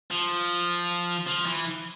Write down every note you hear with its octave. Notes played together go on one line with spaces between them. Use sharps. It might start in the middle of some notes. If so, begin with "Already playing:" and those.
F3
F3
E3